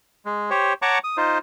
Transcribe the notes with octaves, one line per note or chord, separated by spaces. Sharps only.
G#3
G4 C5 C#5
C#5 F#5 A5 A#5 C#6 D6
D#6
D#4 F4 C5